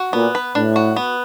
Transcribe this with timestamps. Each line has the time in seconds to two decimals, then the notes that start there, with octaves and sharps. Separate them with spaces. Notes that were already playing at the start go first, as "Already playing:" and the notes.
Already playing: F#4
0.13 A#2 B3
0.35 B4
0.55 A2 D4
0.76 F#4
0.96 B3